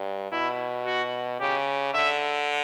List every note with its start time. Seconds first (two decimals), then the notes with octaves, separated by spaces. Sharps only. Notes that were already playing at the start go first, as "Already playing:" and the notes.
Already playing: G2
0.32 B2 E4
0.86 F#4
1.40 C#3 G4
1.94 D3 E5